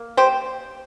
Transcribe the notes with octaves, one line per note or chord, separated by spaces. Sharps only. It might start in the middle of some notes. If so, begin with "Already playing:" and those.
Already playing: A#3
G4 C5